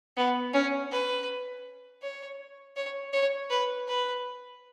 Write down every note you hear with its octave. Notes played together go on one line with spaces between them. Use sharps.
B3
C#4
B4
C#5
C#5
C#5
B4
B4